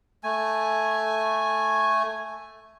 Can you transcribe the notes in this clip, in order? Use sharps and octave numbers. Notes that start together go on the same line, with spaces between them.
A3 G#5